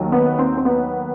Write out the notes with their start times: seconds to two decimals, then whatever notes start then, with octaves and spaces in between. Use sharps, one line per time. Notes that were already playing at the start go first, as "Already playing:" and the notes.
Already playing: D#2 D#3 F#3
0.12 B3
0.39 C4
0.57 C4
0.65 B3